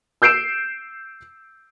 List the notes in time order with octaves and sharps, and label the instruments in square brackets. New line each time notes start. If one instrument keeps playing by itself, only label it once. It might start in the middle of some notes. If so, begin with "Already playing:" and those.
[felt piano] E6 G6 C7 D7 E7